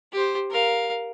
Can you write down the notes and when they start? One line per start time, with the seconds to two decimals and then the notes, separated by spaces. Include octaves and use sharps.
0.13 G4 C5
0.50 A#4 F5